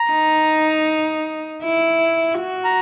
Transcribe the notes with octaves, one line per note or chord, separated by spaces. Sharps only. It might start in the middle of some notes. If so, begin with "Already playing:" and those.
Already playing: A#5
D#4
E4
F#4
A#5